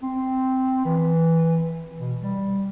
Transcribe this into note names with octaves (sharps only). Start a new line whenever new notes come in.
C4
E3
B2
G3